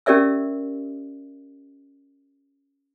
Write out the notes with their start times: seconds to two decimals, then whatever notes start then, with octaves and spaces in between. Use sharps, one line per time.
0.06 C#4 G4 A#4 D5 E5 E6